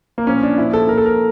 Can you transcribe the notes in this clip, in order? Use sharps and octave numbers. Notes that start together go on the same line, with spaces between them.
A#3
A#2 F3 C#4
D4
A#2 F3 E4
A4
A#2 F3 A#4
A4
A#4